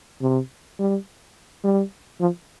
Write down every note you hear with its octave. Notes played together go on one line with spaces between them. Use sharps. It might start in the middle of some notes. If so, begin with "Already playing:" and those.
C3
G3
G3
F3